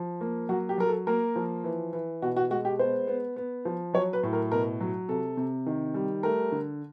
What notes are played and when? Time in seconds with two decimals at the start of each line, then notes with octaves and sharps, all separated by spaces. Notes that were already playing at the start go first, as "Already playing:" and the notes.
Already playing: F3
0.21 A#3
0.49 F#3 F#4
0.69 G4
0.78 F#3 A#4
0.87 A4
1.07 A#3 A#4
1.36 F3
1.64 E3
1.93 E3
2.22 B2 F#4
2.36 F#4
2.50 G#3 F#4
2.65 G4
2.79 B3 C5
3.07 B3
3.36 B3
3.65 F3
3.94 F#3 C#5
4.13 B4
4.23 A2
4.33 A#4
4.52 B2 A#4
4.80 F#3
5.09 C3 A4
5.37 C3
5.66 D#3
5.94 G3
6.23 A3 A#4
6.52 D3